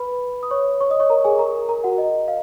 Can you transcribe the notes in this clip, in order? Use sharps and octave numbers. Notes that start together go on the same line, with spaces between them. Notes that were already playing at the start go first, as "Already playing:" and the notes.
Already playing: B4 B5
D#6
C#5 C#6
C#5 C#6
D#5 D#6
C#5 C#6
A#4 A#5
G#4 G#5
A#4 A#5
A#4 A#5
F#4 F#5
D#5
F5